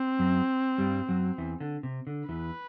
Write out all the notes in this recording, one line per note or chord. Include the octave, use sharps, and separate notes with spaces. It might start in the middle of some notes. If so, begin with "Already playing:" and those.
Already playing: C4
F#2 F#3
G2 G3
F#2 F#3
E2 E3
D3
C3
D3
E2 E3 B4